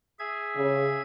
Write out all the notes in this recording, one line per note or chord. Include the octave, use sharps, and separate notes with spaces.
G#4 E5 G#6
C#3